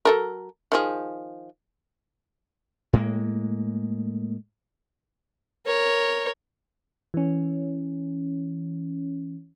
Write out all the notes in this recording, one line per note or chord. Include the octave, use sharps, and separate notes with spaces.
F#3 A4 A#4
D#3 F3 G#4
A2 G#3 A#3
A#4 C#5
E3 C#4